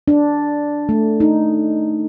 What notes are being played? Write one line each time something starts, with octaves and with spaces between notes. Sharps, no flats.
D4
A3
D#4